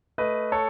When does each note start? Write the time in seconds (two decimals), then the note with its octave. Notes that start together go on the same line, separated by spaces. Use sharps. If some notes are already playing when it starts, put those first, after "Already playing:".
0.18 A3 B4 D#5
0.52 A4 C#5